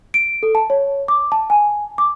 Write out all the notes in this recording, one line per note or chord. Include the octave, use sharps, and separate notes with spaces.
D7
A4
A5
C#5
D6
A5
G#5
D6